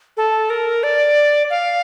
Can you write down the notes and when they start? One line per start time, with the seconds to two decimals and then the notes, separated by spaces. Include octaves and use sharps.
0.17 A4
0.50 A#4
0.83 D5
1.50 F5